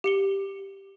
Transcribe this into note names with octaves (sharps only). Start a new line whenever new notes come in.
G4 C#7 G7